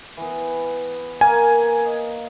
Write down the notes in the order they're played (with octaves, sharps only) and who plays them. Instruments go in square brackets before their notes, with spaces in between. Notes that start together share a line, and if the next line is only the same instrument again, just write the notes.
[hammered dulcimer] E3 B3
[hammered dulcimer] A#3 A#4 [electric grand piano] G#5
[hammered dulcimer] D#5